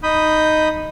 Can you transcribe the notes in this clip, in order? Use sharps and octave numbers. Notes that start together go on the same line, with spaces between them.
D#4 B5 D#6 G6